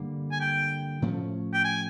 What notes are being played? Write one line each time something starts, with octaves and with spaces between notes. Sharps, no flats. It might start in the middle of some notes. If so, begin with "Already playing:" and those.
Already playing: G2 D3 G3 A#3
G#5
G5
A2 F3 A3 C#4
G5
G#5